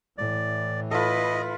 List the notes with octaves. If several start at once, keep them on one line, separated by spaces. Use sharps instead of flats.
A2 E3 D5
E4 F4 A4 B4 D#5